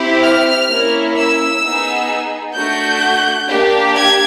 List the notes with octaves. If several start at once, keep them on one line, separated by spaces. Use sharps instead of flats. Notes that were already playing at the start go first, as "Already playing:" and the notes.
Already playing: C4 E4 G4
F6
A#3 C#4 E4
E6
B3 D#4 G#4
A3 D4 F#4 G6
A#3 D4 G4
G#6